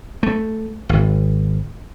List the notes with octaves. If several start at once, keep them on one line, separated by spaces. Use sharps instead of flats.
A3
G#1